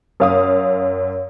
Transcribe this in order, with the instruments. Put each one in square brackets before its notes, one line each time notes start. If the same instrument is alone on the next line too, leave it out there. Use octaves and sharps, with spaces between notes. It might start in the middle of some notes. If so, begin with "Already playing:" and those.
[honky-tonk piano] F#2 F5 D#6